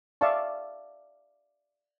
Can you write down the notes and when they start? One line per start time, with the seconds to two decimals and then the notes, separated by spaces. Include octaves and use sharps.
0.21 D5 E5 F5 A5 C#6